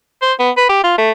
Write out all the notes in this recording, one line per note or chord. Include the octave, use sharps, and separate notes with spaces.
C5
B3
B4
G4
F4
A3